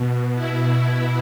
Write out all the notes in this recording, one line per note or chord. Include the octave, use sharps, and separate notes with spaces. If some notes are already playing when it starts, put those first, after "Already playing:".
Already playing: B2
E4
B2